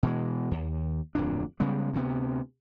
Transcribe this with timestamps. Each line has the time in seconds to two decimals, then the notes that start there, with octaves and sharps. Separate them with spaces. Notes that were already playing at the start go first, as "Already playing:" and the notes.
0.03 B2 E3 G#3
0.51 D#2
1.15 D1 F2 A#2 D4
1.60 C#3 G3 G#3 B3
1.93 D2 C3 B3